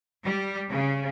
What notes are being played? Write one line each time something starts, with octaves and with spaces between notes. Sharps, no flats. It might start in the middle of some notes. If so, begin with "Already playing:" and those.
G3
C#3